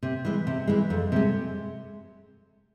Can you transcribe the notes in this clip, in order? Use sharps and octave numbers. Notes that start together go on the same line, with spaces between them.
C3
E3 G#3
C3
E3 G#3
F2
C3 G#3